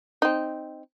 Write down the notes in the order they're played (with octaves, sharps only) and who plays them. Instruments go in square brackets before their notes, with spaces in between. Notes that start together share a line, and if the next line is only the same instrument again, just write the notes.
[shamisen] C4 D#4